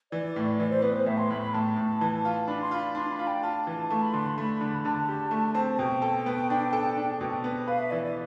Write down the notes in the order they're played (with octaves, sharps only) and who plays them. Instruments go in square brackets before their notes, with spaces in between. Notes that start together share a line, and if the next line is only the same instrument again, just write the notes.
[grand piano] E3 [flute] D5
[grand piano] A2
[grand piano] E3 [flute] D5
[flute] C5
[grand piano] B3 [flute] B4
[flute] C5
[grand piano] A2 [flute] E5
[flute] C6
[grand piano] A2 [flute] B5
[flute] B5
[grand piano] A2 [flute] A5
[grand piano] A2
E3
F4
[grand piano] D4 [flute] B5
[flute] C6
[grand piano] F4 [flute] B5
[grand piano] D4 [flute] C6
[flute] B5
[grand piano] F4
[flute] G5
[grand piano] F4 [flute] A5
[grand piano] E3
[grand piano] A3 [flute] A5
[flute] B5
[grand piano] D3 [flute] C6
[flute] B5
[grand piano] A3 [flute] B5
[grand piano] D3
[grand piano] D3 [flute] A5
[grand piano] G4
A3
C4
[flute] A5
[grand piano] B2 [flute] G5
[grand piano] A4
B3
D4
A4
D4
B2
B3
[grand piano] B4 [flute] F5
[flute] E5
[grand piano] E3 [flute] D5
[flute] D5